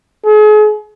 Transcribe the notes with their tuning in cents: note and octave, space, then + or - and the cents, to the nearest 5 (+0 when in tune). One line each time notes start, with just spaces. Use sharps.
G#4 +40